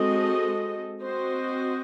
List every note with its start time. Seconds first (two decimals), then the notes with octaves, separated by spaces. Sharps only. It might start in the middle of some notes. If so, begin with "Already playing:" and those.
Already playing: G#3 C4 F#4 A4 D#5
1.01 C4 F#4 C5 D#5